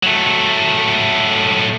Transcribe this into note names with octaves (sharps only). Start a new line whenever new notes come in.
F#3 A3